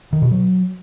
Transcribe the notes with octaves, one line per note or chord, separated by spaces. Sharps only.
D#3
B2
F#3